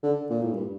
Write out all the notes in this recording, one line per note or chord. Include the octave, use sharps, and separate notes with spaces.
D3
A#2
A2
G2